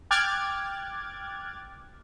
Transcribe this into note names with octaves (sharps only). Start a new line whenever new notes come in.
G5 D6 F6 F#6 G#6 A6